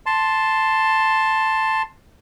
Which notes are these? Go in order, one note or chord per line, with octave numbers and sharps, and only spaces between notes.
A5 C6